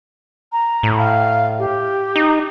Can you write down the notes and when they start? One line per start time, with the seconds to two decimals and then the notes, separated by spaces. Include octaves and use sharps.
0.52 A#5
0.83 A2
0.98 F5
1.59 G4
2.16 D#4